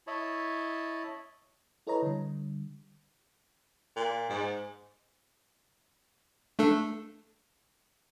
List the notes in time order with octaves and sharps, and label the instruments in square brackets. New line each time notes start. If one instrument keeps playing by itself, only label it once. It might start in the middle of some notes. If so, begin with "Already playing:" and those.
[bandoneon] E4 C#5 D#5 A5 B5
[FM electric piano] E4 A4 B4 C#5 D#5 A#5
D3 G3
[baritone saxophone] A#2
G#2
[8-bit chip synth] A3 D4 A4